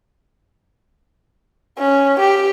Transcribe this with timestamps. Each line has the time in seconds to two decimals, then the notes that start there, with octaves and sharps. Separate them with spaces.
1.79 C#4
2.19 G4